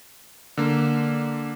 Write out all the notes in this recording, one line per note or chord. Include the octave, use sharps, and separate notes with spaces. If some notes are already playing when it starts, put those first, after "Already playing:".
D3 A#3